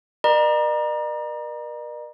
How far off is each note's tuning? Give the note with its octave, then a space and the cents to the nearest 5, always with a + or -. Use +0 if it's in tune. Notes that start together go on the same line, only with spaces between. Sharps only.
A#4 +35 D5 +45 A#5 +30